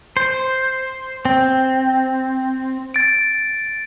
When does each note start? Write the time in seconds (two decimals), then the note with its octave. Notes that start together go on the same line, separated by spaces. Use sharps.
0.17 C5
1.25 C4
2.94 A6 D7